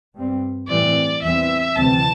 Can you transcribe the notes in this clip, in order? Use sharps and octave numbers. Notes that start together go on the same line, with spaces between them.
G2 G3 C4
A2 E3 G3 C4 D5
E2 E3 G3 C4 E5
D2 C3 E3 G3 C4 A5